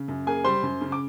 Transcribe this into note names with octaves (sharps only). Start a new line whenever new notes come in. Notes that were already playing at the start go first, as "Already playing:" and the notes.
Already playing: C#3
F#2
A#3 G#4 G#5
G3 C5 C6
F#2
C#3
D6